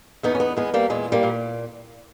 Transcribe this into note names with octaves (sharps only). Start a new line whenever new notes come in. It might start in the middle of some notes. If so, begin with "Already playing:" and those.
E2 B3 D#4
C#4
B3 D#4
E2 G#3 B3
G3 A#3
A#2 G#3
G3 A#3
A#2